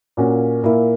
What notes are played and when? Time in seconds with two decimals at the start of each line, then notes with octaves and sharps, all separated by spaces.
0.17 A#2 A#3 C#4 F#4
0.63 A#2 A#3 E4